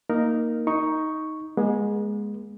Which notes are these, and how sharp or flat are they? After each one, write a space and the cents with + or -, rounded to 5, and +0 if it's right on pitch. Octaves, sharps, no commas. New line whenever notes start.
A#3 +0 D#4 +0 A#4 +0
D#4 +10 C#6 +0
G#3 +0 B3 -45